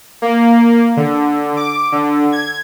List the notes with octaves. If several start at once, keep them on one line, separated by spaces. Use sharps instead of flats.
A#3
D3
D6
D3
G#6